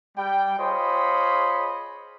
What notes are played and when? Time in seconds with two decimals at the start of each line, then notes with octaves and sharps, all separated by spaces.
0.17 G3 G5
0.60 F4 G#4 C5 C#5 D#5 B5